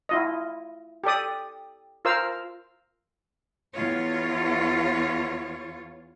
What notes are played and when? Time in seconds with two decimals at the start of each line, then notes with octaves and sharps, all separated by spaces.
0.09 E4 F4 D#5
1.04 G4 A4 D5 D#6
2.05 F4 A#4 C5 F5 E6
3.74 E2 F4 C#5